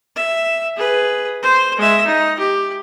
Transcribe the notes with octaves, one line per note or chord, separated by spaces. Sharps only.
E5
G#4 B4
C5
G#3 E5
D#4
G4